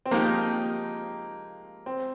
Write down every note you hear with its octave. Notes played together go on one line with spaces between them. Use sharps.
C4
F3 G#3 A#3 D#4 G4
C4